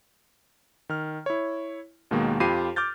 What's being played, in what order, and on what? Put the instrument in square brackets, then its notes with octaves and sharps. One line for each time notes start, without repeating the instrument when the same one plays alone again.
[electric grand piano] D#3 F6
E4 C#5
D#2 B2 D#3 G#3 A#3
F2 F4 G4 B5 C7 D#7
D6 F6 G6 A6